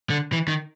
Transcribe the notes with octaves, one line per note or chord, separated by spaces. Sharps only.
D3
E3
D#3